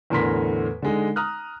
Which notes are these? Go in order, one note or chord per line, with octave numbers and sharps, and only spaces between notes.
E2 A2 D3 A#4 C6 B6
D3 G#3 D#4
A#5 D#6 F6 F#6